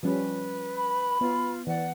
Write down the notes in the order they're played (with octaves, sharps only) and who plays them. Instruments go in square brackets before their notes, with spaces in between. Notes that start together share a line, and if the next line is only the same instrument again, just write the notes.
[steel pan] F3 G3 C#4 [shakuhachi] B4
[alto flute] B5
[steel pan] B3 [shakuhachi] F4
[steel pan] E3 [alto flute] D5 [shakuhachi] F#5